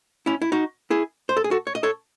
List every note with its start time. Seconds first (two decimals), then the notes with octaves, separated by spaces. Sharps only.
0.26 C#4 E4
0.42 E4
0.52 D#4 F#4
0.90 E4 G#4
1.29 C5
1.37 A4
1.44 G#4
1.51 F#4 A4
1.67 C#5
1.75 D#5
1.83 A4 C#5